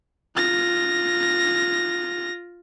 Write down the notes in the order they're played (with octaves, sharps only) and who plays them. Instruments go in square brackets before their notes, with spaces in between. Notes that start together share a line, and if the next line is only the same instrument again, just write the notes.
[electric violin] F4 A#6